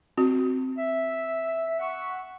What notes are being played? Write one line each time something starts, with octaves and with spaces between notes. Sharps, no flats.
C4 F#4
E5
E5 F#5 C#6